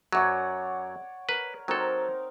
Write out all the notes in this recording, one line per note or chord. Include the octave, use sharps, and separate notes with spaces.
F#2 F#3 C#5 D5 F#5
A#4 B4
F#3 C4 D#4 A4 A#4